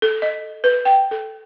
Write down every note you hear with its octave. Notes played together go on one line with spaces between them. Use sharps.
A4
D#5
B4
G5
A4